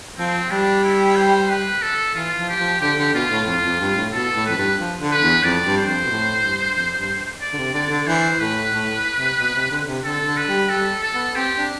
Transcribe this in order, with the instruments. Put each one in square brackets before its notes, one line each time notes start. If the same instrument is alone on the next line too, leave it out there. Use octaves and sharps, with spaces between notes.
[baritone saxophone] F3 [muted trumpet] C4
[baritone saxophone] G3 [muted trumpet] D4
[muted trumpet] E4
C5
B4
A4
[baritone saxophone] E3 [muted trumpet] F4
[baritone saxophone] F3
[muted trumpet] G4
[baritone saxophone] F3
[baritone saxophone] D3 [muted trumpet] G4
[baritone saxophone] D3
[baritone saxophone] B2 [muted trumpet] F4
[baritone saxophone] A2
[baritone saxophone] F2 [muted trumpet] F4
[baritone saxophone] F2
G2
A2
[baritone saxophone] B2 [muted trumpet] A4
[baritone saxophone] A2
[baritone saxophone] F2 [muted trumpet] B4
[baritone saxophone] G2
F3
D3
[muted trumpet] B4
[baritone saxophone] E2
[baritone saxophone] F2 [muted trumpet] D5
[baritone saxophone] G2
[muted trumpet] C5
[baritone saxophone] F2
B2
A2
G2
F2
G2
[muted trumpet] D5
[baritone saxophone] D3
C3
[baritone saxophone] D3 [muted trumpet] D5
[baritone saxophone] D3
[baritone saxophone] E3 [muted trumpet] C5
[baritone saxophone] A2 [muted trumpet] B4
[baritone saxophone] A2
C3
B2
C3
D3
C3
[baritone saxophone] D3 [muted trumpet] A4
[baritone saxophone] D3
[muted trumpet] B4
[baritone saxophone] G3
[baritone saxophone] G3 [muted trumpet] A4
[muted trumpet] A4
[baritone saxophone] B3
[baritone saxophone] C4 [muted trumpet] G4
[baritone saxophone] D4